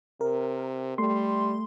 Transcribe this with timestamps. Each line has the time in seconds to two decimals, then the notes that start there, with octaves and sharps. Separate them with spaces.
0.21 C3 A#4
0.98 G3 A3 C6